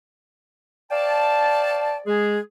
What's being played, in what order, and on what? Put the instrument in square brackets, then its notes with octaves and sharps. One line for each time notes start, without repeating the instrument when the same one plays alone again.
[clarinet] D5 [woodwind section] F5 G5 A5
[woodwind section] G#3 G#4